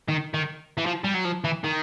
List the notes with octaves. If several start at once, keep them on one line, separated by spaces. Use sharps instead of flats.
D#3
D#3
E3
F3
G3
F#3
F3
E3
D#3